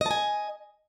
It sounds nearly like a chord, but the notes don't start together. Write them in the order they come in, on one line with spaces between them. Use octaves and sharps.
D#5 A5 G#5